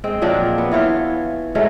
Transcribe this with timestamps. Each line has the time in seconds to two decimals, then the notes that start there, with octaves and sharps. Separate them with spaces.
0.04 G#3 C4
0.22 A#2 F3 F#3 D4
0.58 B3
0.72 E3 F4 C#5
1.55 F#3 G#3 A3 C#4